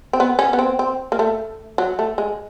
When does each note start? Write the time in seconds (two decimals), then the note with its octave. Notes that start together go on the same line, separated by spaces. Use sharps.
0.13 C4
0.20 B3
0.39 C#4
0.53 B3
0.59 C4
0.79 C4
1.12 A#3
1.19 A3
1.78 F#3
1.99 A3
2.18 G#3